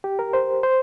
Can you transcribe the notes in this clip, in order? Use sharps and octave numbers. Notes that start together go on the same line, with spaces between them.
G4
A#4
C5
C5